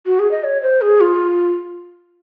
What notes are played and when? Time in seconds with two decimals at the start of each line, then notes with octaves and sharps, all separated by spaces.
0.06 F#4
0.19 G#4
0.31 D#5
0.44 C#5
0.62 C5
0.81 G#4
1.01 F4